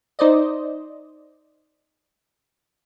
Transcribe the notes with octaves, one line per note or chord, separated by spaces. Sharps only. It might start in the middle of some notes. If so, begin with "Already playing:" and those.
D#4 C5 D5 D#5